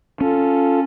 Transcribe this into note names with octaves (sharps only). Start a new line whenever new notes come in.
C#4 F4 A4